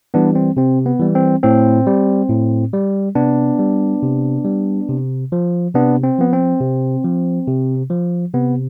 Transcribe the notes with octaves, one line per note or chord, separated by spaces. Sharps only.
E3 G3 B3 D4
C4
C3 C4
B3
E3 G3
C4
A2 C4
G3
A2
G3
C3 B3 D4
G3
C3
G3
C3
F3
C3 B3 D4
C4
F3 B3
C4
C3
F3
C3
F3
C3 B3